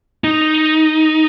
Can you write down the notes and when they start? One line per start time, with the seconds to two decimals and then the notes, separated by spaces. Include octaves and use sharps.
0.24 D#4